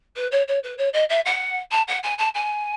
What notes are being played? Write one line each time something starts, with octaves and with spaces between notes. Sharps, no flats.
B4
C#5
C#5
B4
C#5
D#5
E5
F#5
A5
F#5
G#5
A5
G#5